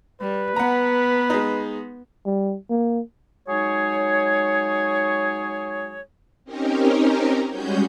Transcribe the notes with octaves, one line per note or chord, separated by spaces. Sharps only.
G3 B4
B3 F#5 A#5
G#3 D#4
G3
A#3
F#3 G#3 D#4 G#4 C#5
C4 C#4 D#4 G4 A#4
G3 G#3 C#4 F#4 G#4 G6